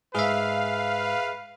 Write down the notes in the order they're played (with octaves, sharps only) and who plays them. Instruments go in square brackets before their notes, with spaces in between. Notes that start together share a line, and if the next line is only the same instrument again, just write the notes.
[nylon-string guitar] G#2 [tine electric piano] G#4 E5 [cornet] B4 [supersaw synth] F5